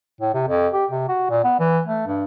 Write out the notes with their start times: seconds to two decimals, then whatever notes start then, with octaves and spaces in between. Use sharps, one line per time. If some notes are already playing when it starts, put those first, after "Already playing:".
0.21 A2
0.34 C3
0.48 F2
0.74 G4
0.91 C3
1.09 F#4
1.30 A#2
1.44 B3
1.59 E3
1.86 A3
2.07 G2